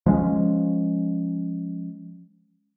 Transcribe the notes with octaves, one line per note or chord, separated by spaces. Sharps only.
F3 G#3 C#4